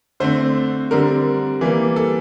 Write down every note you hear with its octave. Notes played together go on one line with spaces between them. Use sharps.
D3 A3 C4 C5
D3 G3 C4 A#4
E3 G3 A#3
A4